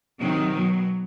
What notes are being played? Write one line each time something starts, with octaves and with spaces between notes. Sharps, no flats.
C3 D#3 F#3
B2 F#3